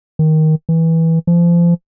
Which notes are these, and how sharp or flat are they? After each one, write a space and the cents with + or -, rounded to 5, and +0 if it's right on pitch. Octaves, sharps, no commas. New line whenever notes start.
D#3 +10
E3 -15
F3 -30